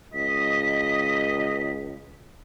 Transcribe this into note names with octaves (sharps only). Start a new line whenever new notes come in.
C#2 D#5 B6